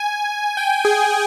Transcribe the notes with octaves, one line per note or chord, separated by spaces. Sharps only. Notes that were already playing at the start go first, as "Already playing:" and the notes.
Already playing: G#5
G5
G#4